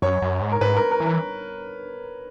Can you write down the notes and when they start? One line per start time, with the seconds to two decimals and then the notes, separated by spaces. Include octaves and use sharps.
0.02 F#2 C#5
0.22 F#2
0.41 G#2
0.52 A#4
0.61 G#2 B4
0.77 A#4
0.91 A#4
1.00 E3
1.06 A#4